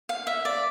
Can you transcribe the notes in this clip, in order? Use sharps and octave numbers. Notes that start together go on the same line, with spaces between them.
F5
E5
D5